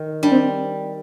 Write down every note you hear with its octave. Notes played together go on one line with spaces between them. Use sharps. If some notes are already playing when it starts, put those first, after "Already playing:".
Already playing: D#3
G3 D4
C4